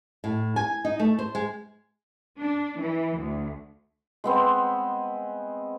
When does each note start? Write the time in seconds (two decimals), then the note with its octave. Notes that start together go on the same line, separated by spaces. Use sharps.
0.24 A2
0.56 G#5
0.85 D#4
0.99 A3
1.19 C5
1.35 G#3
2.39 D4
2.78 E3
3.18 D2
4.24 G#3 B3 C4